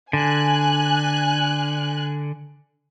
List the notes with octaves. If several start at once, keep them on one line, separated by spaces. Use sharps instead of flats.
D3 G#5 F#6